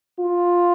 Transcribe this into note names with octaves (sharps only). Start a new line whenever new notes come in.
F4